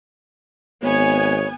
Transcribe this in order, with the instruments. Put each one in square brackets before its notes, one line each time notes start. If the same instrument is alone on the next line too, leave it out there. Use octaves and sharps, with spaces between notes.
[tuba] G#1 [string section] B3 G#5 [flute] C#5